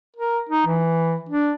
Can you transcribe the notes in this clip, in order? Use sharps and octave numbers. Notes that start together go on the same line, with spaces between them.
A#4
D#4
E3
D4